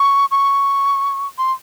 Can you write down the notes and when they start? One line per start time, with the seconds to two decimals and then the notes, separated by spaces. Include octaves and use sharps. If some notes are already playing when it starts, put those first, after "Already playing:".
Already playing: C#6
0.31 C#6
1.38 C6